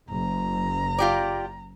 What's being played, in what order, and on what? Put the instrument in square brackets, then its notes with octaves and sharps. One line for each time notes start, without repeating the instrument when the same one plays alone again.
[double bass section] F#1 [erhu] A#5
[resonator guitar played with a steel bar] F4 G4 D5